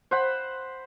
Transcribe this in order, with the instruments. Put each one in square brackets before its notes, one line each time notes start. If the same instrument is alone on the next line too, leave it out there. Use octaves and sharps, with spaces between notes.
[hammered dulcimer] C5 F#5 B5